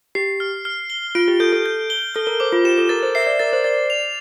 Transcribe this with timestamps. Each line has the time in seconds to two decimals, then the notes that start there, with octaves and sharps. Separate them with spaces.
0.15 G4 C7
0.40 F6
0.65 F6
0.90 G7
1.15 F4 D7
1.28 G4
1.40 A4 G6
1.52 A4
1.66 G6
1.90 G7
2.15 A4 F6
2.27 A#4
2.40 C5 D6
2.52 F4
2.64 G4 E7
2.78 A4
2.89 A#4 A6
3.03 C5
3.15 E5 C7
3.27 D5
3.39 A#4 A6
3.53 C5
3.64 D5 A6
3.90 F7